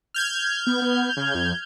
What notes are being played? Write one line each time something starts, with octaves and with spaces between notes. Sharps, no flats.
F6 G6 G#6
B3
B3
C#3
F2